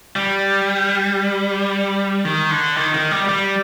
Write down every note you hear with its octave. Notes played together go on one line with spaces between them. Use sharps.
G3
D#3
D3
D#3
D#3
G3
G3